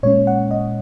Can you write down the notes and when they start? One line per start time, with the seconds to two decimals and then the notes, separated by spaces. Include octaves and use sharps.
0.03 A#2 G#3 C#4 C#5
0.27 F#5
0.51 D#5